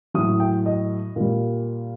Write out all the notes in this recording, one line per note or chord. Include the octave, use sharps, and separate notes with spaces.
A2 F#3 D#6
G5
D#5
A#2 G3